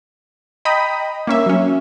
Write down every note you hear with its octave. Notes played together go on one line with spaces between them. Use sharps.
D#5 G5 A#5 B5 D#6
A#3 C#4 E5
F#3 C#4